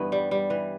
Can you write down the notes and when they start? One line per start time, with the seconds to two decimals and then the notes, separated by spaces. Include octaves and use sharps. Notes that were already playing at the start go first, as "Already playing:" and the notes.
Already playing: G2 E3 B3
0.12 G3
0.31 G3
0.50 E3